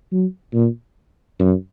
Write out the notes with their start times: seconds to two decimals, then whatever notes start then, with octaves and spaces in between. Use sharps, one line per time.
0.12 F#3
0.53 A#2
1.40 F#2